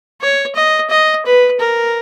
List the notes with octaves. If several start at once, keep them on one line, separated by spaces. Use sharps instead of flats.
C#5
D#5
D#5
B4
A#4